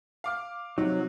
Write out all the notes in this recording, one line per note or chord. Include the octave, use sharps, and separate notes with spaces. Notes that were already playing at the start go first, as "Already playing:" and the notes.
F5 D6 F6
C3 F#3 D#4